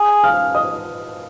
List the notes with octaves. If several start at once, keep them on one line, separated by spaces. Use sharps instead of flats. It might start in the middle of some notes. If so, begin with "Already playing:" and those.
Already playing: G#4
F5 F6
D#5 D#6